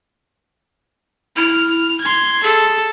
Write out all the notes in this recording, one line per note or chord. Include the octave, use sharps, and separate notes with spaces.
E4 F6
C6 G#6
G#4 A4